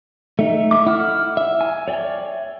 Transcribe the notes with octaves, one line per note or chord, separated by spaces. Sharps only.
A3 D#4 E5
E5 D6
E4 F#5 F6
E5
G#5
C#5 D5 G5